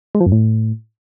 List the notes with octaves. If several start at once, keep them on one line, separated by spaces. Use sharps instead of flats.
G#3
F3
F#2
A2